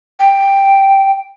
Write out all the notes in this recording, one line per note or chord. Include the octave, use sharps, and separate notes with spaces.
G5